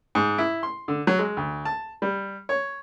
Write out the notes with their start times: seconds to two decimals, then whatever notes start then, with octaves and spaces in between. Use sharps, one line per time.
0.15 G#2
0.38 E4
0.63 C6
0.88 D3
1.07 F#3
1.19 G#3
1.37 D2
1.65 A5
2.02 G3
2.49 C#5